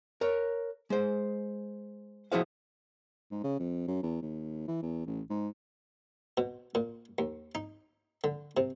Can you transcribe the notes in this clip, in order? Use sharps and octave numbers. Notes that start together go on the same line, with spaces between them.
A#4 C#5
G#3 C5
F3 E4 F#4 G#4 C5 F5
G#2
C#3
F2
F#2
E2
D#2
E3
E2
A1
G#2
B2
A#2
D#2
D#4
D3
C3